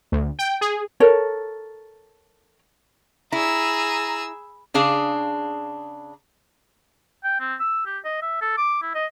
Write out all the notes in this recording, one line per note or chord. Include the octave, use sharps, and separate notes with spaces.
D2
G5
G#4
A4 A#4 C#5
E4 G#4 A#5 E6
C#3 D4 G#4 F5
G5
C4
E6
G4
D#5
E5
A4
D6
E4
D#5